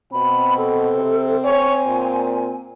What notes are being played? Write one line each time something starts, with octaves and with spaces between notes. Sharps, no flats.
B2 C4 B5
A4
C3
C#5 G#5
A#2